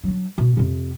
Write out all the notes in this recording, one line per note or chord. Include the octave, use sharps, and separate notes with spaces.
F#3 D4
B2
F2 C3